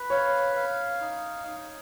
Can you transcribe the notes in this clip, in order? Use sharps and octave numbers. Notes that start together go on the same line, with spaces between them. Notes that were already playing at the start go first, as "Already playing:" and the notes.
Already playing: B4
C#5 F5
F5
D#4
D#4